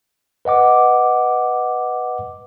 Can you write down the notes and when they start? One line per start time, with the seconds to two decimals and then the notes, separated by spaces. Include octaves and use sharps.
0.45 B4 D#5 F#5 D6